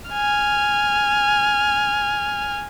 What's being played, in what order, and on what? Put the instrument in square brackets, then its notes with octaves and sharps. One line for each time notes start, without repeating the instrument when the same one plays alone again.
[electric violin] G#5 F6